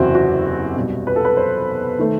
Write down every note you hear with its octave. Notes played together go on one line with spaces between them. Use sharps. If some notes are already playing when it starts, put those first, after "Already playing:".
Already playing: F#1 E2 C3 C4 E4 F#4
F#4
B1 B2 G3
B4
A4
B4
C5
D#3 A3